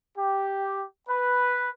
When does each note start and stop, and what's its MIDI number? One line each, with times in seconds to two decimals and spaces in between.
0.16 0.82 67
1.07 1.68 71